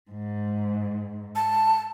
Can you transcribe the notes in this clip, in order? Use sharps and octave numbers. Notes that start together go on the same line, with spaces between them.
G#2
A5